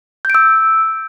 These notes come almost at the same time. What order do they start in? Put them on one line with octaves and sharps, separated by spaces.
G6 D7 E6